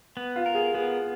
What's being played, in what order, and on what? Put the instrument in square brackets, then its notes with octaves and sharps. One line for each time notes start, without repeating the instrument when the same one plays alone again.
[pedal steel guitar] B3
[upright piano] F4
[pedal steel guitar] A#4
[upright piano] G#4
[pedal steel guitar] B3 [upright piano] G#4